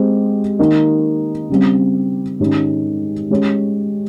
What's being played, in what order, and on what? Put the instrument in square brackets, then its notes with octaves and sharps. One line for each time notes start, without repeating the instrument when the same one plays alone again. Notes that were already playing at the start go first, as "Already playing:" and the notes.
Already playing: [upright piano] G#3 C4 G4 C5
D#3 A#3 D#4
C#3 G3 C4
G#2 D#3 G#3 C#4 G4
G#3 C#4 G4 C#5